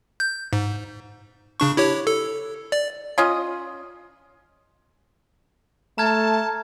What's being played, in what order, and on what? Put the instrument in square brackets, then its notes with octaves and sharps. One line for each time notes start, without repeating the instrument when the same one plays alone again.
[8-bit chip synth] G6
G#2
C#3 D4 C#6
E4 G4 C#5
A4
D5
[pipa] C#4 F4 D#5
[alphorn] A3 [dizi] A5 [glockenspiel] A#5 F6 G#6